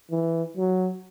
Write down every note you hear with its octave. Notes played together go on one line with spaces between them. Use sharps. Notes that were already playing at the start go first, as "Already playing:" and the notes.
E3
F#3